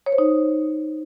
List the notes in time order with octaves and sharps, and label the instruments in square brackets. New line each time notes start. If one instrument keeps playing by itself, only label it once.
[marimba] C#5
C5
D#4